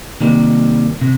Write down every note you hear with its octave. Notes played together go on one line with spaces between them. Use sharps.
C3 D#3 G3 A#3
C3